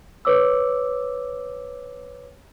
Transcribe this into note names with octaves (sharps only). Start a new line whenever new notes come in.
B4 C#5 D6 E6